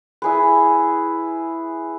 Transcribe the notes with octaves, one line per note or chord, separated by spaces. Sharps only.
E4 G#4 B4